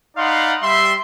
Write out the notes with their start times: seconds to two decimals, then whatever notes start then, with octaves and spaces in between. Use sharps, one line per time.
0.17 D#4 D5 F5 F#5 B5 C6
0.62 G3 E5 C6